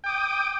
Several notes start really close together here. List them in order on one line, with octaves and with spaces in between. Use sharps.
G5 D6 D#6